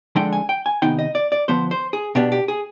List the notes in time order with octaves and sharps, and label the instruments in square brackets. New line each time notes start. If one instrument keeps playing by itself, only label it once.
[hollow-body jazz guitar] D3 F3 G#3 D4 G5
G#5
G5
G#5
C3 D#3 B3 D#4 G5
D#5
D5
D5
D3 F3 B3 C5
C5
G#4
B2 B3 D4 G4
G4
G#4